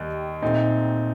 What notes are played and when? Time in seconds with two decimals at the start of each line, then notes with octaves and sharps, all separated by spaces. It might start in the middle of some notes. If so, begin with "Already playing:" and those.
Already playing: D#2 D#3 G3
0.42 A#2 A3 C4 D#4